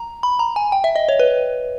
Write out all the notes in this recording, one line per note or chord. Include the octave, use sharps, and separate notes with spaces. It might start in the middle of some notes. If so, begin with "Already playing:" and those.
Already playing: A#5
B5
A#5
G#5
G5
E5
D#5
C#5
B4